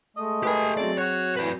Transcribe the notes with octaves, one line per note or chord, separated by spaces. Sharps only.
G#3 A3 D#5
G4 A#4 B4 G5 G#5
F#3 C4 G#4 D5
F#4 C#5
A2 E3 B4 D5